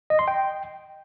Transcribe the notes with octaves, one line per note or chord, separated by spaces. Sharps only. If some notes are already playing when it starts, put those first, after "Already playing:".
D#5
C6
G5